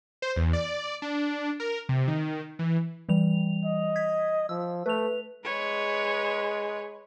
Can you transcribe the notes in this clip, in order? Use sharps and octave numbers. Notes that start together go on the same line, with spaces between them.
C5
E2
D5
D4
A#4
C3
D#3
E3
E3 G3 F7
D#5
G#6 B6
F3 E6
A3 B4 F7
G#3 B4 C#5